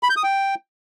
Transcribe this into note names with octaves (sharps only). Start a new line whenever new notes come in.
B5
G6
D#6
G5